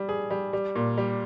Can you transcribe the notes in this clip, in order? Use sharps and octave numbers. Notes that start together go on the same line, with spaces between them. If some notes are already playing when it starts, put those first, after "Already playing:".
Already playing: G3
G#4
G3
G3
A#2
G3